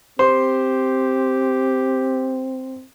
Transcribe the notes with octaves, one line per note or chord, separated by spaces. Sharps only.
C4 G4 C5